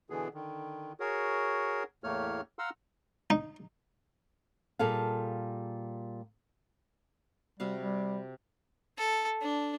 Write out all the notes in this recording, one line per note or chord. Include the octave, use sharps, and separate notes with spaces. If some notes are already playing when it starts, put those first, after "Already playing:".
B2 D3 E3 B3 G#4
D3 D#3
F#4 G#4 A#4 C#5
E2 A2 A3 A#3 C#5 F6
F5 F#5 A#5 C6 E6 F6
D#4
A#2 G3 G#4 A4 F5
C3 G3 F#4 F5
G3
A4
D4